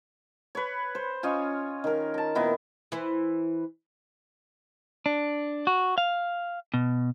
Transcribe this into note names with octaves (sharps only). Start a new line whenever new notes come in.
B4 C#5
C5
C#4 F4 C#5 D#5
D#3 A#4
A5 A#5
A#2 D#3 B3 E4
E3 E4 C5
D4
F#4
F5
B2